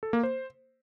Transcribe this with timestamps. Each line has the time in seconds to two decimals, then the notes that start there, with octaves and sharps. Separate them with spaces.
0.03 A4
0.13 A#3
0.23 C5